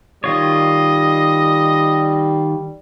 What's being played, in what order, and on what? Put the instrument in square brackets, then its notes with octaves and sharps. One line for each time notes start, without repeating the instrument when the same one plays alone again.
[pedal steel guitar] D#3 F4 C#5 [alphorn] G3 [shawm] D#5